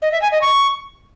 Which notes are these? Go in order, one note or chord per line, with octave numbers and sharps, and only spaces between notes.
D#5
E5
G#5
D#5
C#6